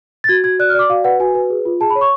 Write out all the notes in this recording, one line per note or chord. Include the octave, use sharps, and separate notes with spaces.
A6
F#4 G#6
F#4 G#6
D5 F#6
F6
D5 D6
F#4 F5
B4 F#5
F#4 G#5
B4
G#4
F4
G#4 A5
B5
C#5
C#6